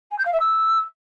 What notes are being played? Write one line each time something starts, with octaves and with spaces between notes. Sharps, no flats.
G#5
G6
F5
E5
E6